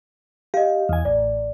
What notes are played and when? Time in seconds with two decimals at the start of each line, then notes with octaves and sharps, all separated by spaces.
0.54 G4 D#5 F5
0.89 E2 G#5
1.05 A1 D5